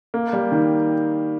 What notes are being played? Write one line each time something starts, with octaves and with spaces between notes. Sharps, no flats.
A#3
G3
D#3